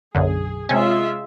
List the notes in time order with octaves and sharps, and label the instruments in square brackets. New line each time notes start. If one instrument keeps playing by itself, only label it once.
[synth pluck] B1 F#2 D3 [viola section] G#4
[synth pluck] C3 C#4 [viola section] G#3 F4 E5